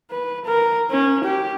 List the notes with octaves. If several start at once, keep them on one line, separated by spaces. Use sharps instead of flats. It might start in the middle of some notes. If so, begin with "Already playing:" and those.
B4
A#4
C#4
G4